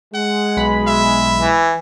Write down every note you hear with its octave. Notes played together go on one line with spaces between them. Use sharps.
G#3 F#5
B1 B5
E5
E3